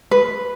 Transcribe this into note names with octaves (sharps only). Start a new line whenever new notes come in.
B4